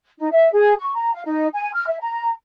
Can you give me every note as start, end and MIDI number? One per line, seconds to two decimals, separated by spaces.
0.18 0.28 63
0.31 0.50 76
0.52 0.73 68
0.79 0.92 85
0.93 1.13 82
1.13 1.21 77
1.25 1.46 63
1.53 1.73 80
1.74 1.85 89
1.87 1.97 76
2.00 2.30 82